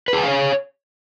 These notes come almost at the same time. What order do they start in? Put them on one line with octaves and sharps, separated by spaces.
B4 G#4 G#5 F5 C#5